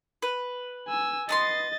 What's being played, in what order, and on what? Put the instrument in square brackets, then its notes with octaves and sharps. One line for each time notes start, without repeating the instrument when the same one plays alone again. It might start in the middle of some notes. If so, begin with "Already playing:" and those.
[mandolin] B4
[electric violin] G#5 E6
[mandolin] B3 A#5 C6 [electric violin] D#5 A6